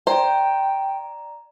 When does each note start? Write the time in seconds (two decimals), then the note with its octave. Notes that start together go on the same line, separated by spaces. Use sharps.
0.07 C5 D5 G5 A#5